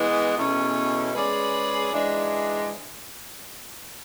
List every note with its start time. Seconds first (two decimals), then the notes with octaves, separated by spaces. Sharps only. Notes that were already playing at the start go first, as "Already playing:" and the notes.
Already playing: E3 G#3 B3
0.37 E2 B2 A3 C#4
1.15 G#3 C#4 G#4 B4 D5
1.92 G#2 E3 G#3 D4